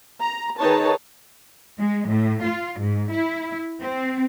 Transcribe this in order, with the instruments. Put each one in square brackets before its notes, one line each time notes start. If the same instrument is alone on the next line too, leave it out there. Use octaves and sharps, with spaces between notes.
[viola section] A#5
D#3 D#4 G#4 B4 C#5 A5
[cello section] G#3
A2
F4
G#2
E4
C4